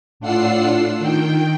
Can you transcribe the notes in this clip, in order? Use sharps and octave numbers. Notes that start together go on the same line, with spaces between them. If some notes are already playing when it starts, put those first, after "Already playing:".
A2 D4 F4 F#5 E6 C7
D#3 G5